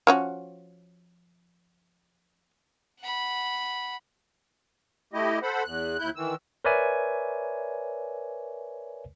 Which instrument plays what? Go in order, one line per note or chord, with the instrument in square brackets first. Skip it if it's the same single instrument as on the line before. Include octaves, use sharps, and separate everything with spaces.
[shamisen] F3 C#4 F#4
[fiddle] F#5 B5
[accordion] A3 E4 G4 D#5
A4 C5 F#5 B5
E2 F#6
D#2 E4 F#6 G6
D#3 E3 E6
[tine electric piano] A#4 B4 C#5 D5 E5 G#5